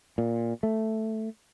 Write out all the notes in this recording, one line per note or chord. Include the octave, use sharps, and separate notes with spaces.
A#2
A3